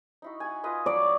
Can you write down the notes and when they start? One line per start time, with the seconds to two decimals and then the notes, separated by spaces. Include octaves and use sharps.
0.22 D#4 E4 F#4
0.40 F#5 G#5
0.64 F4 B4 D#5
0.86 F#3 F#4 D5 B5